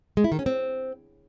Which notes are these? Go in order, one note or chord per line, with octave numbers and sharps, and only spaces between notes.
G#3
E4
D#3
C#4
C4